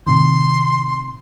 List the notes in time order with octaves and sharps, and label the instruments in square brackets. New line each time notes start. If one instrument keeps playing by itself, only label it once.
[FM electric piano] A2 C3 D#3 [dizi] C6